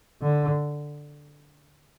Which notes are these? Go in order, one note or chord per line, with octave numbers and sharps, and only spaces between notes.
D3